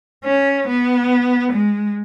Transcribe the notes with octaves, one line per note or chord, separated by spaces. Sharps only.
C#4
B3
G#3